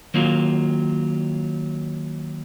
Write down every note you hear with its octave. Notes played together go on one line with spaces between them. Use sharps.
D#3 F#3 A#3 F4